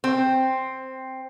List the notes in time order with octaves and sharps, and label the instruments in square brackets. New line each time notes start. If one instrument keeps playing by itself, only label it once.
[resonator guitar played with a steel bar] C4